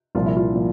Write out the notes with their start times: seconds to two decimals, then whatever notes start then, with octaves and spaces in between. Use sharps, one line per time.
0.15 C2 A#2 F3 F4
0.26 E4
0.37 F4
0.54 A#2 F3